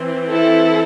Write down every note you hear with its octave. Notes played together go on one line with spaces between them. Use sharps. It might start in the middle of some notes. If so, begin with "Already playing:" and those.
Already playing: E3 C4
E4 A4